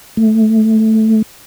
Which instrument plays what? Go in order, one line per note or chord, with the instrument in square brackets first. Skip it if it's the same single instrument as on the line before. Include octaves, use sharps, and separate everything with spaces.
[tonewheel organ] A3